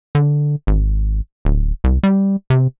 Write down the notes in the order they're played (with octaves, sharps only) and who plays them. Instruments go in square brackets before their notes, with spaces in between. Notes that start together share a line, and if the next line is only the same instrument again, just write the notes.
[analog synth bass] D3
G#1
D1
C2
G3
C3